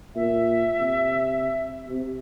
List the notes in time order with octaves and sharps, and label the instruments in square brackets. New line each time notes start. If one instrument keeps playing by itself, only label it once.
[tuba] A#2 [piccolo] E5
[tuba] C3
C3